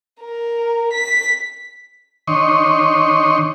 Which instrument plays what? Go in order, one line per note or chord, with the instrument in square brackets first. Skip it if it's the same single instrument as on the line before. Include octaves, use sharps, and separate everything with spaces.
[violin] A#4
B6
[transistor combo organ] D#3 D4 C#5 D#5 C6 C#6